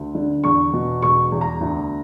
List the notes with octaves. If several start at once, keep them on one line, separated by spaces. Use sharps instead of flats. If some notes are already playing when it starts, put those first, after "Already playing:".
Already playing: D2
D3
E2 C#6
B2
E1 C#6
E2
A#5
D2